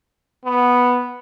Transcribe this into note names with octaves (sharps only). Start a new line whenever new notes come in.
B3